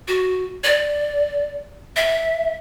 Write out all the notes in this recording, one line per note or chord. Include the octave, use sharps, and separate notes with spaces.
F#4
D5
E5